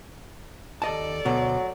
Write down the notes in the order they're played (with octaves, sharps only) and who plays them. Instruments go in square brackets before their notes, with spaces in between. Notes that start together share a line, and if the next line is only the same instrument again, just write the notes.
[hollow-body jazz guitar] D#2 D#5 A5 [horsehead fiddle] A4 D5
[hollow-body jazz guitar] D2 B2 [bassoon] F#3